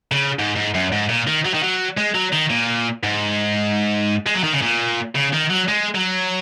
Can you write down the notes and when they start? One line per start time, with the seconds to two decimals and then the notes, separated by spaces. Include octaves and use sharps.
0.12 C#3
0.39 G#2
0.56 G#2
0.74 F#2
0.92 G#2
1.09 A#2
1.27 D#3
1.45 F#3
1.54 D#3
1.63 F#3
1.97 G#3
2.15 F#3
2.33 D#3
2.50 A#2
3.03 G#2
4.26 G#3
4.34 F#3
4.44 D#3
4.53 C#3
4.62 A#2
5.15 C#3
5.33 D#3
5.50 F#3
5.68 G#3
5.95 F#3